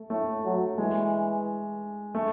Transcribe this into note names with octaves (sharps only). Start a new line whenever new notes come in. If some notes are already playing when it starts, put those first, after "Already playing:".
Already playing: A3
A2 A3
F#3
E3 G#3
A3